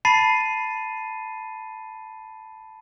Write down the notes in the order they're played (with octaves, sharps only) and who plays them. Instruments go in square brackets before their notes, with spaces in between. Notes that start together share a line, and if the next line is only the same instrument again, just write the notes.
[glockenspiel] A5 B5 A6 C7 D#7